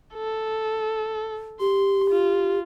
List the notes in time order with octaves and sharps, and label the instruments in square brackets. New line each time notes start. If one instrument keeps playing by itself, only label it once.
[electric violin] A4
[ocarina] G4 [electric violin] C6
[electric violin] F4